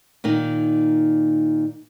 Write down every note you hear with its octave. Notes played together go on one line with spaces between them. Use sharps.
A#2 D#3 D#4